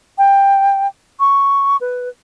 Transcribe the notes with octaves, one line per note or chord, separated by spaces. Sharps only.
G5
C#6
B4